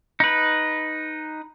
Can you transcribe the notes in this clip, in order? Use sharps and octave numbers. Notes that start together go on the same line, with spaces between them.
D#4 B4